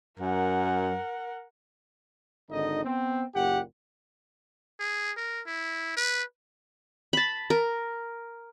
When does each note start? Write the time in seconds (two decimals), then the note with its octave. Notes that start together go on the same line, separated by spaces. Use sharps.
0.19 F#2 A#4 F#5
2.49 G#1 D3 D#4 D#5
2.83 B3 C4
3.35 F#1 A#2 G4 F#5
4.80 G#4
5.17 A#4
5.47 E4
5.97 B4
7.13 A5 B5
7.50 A#4